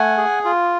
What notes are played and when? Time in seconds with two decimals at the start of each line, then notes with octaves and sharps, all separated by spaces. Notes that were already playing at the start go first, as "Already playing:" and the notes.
Already playing: A3 F#5 G#5
0.18 G#4
0.45 F4